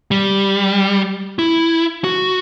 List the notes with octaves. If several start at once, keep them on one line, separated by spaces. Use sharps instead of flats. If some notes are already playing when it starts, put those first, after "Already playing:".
G3
E4
F#4